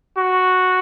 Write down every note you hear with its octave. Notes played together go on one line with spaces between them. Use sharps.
F#4